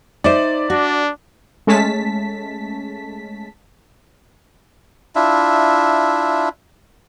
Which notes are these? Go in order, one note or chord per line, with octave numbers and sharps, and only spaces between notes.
D#4 C5 D5 E5 D6
D4 F#4
G#3 A3 C#4 A5 B6
D4 E4 F4 E5